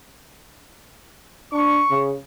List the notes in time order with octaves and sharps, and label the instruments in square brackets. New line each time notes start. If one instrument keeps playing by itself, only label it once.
[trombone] D4 [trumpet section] C#6
[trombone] C#3